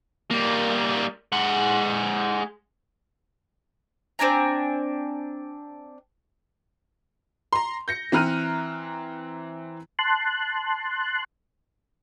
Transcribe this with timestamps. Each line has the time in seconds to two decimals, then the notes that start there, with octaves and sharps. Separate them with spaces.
0.31 G3 A#3
1.32 G#3 F#5
4.19 C4 D4 G#5 A#5
7.53 A#5 C6
7.88 G6 A#6 C#7
8.12 E3 C4 A#5 F6 F#6 D#7
9.99 A5 C6 F#6